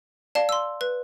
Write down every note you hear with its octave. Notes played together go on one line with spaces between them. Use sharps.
D5 F5 A5
C6 E6
B4